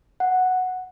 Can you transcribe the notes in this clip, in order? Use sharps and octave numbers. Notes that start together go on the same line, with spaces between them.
F#5